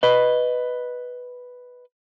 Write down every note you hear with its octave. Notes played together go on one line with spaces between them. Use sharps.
B4 D#5